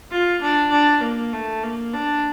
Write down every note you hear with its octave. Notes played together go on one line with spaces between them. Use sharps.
F4
D4
D4
A#3
A3
A#3
D4